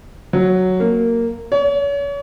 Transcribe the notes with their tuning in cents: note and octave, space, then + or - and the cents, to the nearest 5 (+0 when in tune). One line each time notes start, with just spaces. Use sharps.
F#3 +0
A#3 -10
C#5 +35